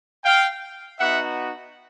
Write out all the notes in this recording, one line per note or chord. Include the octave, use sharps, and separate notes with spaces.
F5 G5
B3 D#4 F#4 E5 F#5